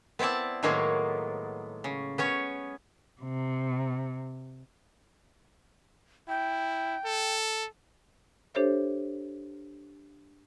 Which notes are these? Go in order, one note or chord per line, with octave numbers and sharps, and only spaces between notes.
B3 C4 E4 D5 A5
A2 D#3 F#3 G#3 A#3 B3
C#3
B3 C#4 C#5
C3
E4 G5
A4
D4 G4 A4 C5 C#5 E5